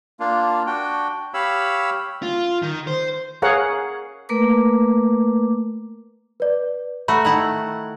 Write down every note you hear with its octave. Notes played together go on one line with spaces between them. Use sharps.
A#3 D4 F4
D4 F#4 G5
G4 C#5 F5 B5 E6
F4
D#3
C5
G#4 A#4 C#5 F5 F#5
A3 A#3 A#4 B4 D6
B4 D5
A3 F#4 A#5 B5
D#3 E4 F#5